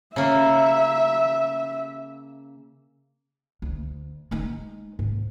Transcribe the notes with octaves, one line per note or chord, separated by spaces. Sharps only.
C#3 A#3 E5
D2
G#3 D#4
G#2